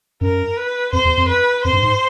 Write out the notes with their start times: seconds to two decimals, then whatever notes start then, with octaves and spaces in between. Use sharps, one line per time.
0.21 F#2 A#4
0.57 B4
0.92 F2 C5
1.05 E2
1.17 F2
1.28 B4
1.64 F2 C5
1.73 G2
1.83 G#2